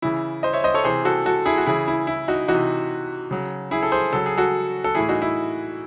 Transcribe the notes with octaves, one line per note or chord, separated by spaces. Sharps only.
C#3 E3 E4
C5 D#5
C#5 E5
C5 D#5
A4 C#5
C3 E3 G#4 C5
F#4 A4
F#4 A4
E4 G#4
F#4
C#3 E3 E4 G#4
E4
E4
D#4 F#4
E3 D#4 F#4
C3
C#3 F#3
E4 G#4
A4
G#4 C5
C#3 F#3 A4
G#4
F#4 A4
A4
A2 E3 E4 G#4
D#4 F#4
E4